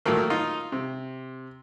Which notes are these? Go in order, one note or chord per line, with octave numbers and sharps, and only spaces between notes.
A#2 D#3 F#3 A3 A#3
D#4 F4 F5
C3